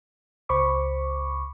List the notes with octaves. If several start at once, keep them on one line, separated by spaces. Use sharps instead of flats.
C#2 C5 B5 C#6 D6